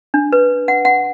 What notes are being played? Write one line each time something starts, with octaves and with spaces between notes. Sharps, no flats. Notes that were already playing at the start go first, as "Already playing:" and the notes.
D4
B4
F#5
F#5